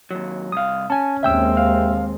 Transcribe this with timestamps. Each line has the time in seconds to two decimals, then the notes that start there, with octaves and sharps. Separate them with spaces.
0.11 D#2 F#3
0.52 C2 F5 D#6
0.90 C#4 G#5 A5
1.23 D#2 G#3 C4 E5 G5 E6
1.57 F5